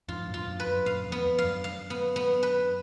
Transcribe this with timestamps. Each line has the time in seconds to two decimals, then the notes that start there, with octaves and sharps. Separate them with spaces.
0.08 F2 G#2 F4
0.27 F#2 A#2
0.34 F4
0.47 F#2
0.60 B4
0.67 F#2
0.86 F#2 A#2 F5
1.06 F2
1.12 B3
1.26 F2
1.38 F5
1.45 F#2
1.64 F5
1.90 B3
2.16 B3
2.43 B4